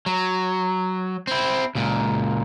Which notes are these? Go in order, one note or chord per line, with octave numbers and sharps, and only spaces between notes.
F#3
C4 E4
C#2 A#2